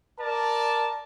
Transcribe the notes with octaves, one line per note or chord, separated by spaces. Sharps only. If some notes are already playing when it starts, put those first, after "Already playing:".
A#4 D5 A5